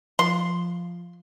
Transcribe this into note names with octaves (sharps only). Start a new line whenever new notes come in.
F3 C6